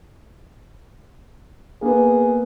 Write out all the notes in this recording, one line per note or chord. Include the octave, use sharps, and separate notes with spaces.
A#3 B3 G#4